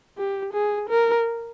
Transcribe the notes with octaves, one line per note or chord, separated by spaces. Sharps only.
G4
G#4
A#4